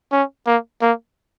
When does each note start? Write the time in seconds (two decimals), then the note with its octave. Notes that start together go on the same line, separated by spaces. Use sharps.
0.12 C#4
0.47 A#3
0.82 A#3